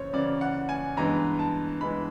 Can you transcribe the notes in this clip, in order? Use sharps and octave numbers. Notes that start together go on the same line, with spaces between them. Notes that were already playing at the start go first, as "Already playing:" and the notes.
Already playing: F#2 C#3 E3 C5 C#5
F#2 C#3 E3 D5
F#5
G#5
G2 E3 G#3 B3 A#5
A5
G2 E3 G#3 B3 B5